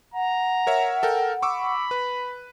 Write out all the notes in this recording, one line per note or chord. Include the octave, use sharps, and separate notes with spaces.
F#5 A#5
A#4 C#5 E5
A4 A#4 G5
B5 C#6 D6 E6
B4